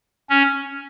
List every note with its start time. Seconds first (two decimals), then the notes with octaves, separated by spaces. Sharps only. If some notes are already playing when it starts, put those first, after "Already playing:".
0.30 C#4